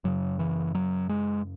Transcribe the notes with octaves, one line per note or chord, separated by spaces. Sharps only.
F#2 C#3 F#3
E3
F#3
G#3